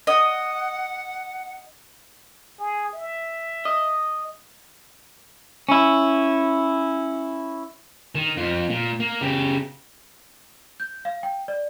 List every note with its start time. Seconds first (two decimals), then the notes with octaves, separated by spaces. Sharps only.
0.07 D#5 F#5
2.59 G#4
2.93 E5
3.65 D#5
5.69 C#4 E4
8.15 D#3
8.37 F2 F4
8.70 A#2
9.00 A#3
9.21 C#3 G4
10.80 G6
11.05 F5
11.23 G5
11.48 D5